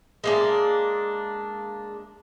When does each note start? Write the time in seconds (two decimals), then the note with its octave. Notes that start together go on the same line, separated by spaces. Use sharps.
0.24 G#3 A#3 D4